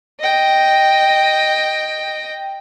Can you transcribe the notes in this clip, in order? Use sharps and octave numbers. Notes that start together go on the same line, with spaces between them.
D#5 G5